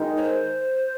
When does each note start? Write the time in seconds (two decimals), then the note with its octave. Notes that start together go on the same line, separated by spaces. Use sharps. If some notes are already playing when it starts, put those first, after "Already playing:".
Already playing: D#3 G#3 D#4
0.17 C#5
0.22 C5